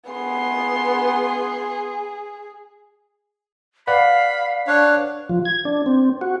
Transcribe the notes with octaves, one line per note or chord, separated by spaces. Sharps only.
B3 G#4 C6
B4 D5 F5 F#5 B5
D4 C#5 F5 F#6
F3
G#6
D4
C4
F#4